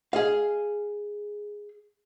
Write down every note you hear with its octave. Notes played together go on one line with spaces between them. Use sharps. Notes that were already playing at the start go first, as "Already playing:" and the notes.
G#4 D#5 F5